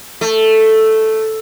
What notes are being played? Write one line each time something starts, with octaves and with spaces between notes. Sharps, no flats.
A3